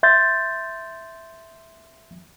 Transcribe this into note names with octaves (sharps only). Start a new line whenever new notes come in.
E5 C6 G6 A6